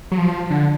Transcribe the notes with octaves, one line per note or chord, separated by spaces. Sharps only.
F#3
F3
D3